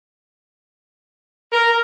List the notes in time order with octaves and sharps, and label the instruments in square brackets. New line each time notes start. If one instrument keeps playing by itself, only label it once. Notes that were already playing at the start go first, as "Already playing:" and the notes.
[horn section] A#4